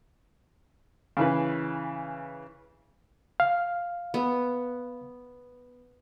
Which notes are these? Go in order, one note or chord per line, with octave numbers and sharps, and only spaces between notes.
C#3 E3 B4
F5
B3